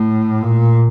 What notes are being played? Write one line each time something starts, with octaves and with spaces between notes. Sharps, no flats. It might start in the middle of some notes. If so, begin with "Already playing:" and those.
Already playing: A2
A#2